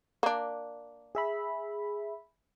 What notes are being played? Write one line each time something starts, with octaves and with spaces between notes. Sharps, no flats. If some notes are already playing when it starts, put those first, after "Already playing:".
A#3 D4
G#4 E5 B5